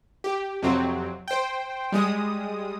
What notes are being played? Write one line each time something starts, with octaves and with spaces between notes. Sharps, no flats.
G4
F2 C3 F#3 C4
C5 G5
G3 G#3 D#6